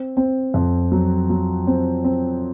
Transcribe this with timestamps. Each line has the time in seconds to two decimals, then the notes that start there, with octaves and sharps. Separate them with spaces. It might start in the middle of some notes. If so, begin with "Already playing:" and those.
Already playing: C4
0.17 C4
0.54 F2
0.92 F#3
1.30 F#3
1.67 C4
2.04 C4